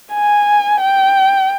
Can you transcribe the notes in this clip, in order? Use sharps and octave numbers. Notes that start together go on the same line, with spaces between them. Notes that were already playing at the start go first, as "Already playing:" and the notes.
G#5
G5